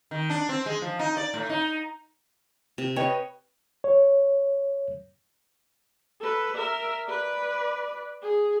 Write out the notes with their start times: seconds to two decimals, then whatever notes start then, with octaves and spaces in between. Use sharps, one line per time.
0.11 D#3
0.30 D4
0.49 C4
0.66 G#3
0.82 F3
0.99 D#4
1.17 D5
1.34 A2
1.49 D#4
2.78 C3
2.96 B4 C#5 D#5 G5
3.84 C#5
6.21 A4 B4
6.57 A#4 E5
7.07 B4 D5
8.23 G#4